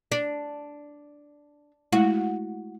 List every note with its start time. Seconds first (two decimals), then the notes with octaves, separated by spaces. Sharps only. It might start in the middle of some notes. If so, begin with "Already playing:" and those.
0.12 D4
1.93 G#3 A3 E4 F#4